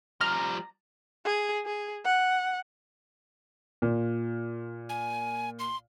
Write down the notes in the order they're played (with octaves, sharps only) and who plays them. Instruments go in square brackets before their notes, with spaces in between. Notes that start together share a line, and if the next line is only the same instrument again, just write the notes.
[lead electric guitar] F3 G3 [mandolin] A#5 [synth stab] F6
[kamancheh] G#4
G#4
F#5
[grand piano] A#2
[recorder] G#5
C6